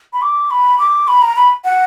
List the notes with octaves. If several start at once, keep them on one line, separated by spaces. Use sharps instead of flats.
B5
D6
B5
D6
B5
A#5
B5
F#5